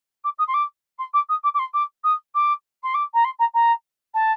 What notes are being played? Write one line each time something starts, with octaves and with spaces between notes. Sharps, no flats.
D6
D#6
C6
D6
C6
D6
D#6
D6
D6
C6
D6
D#6
D6
C6
D6
A#5
C6
A#5
A#5
A5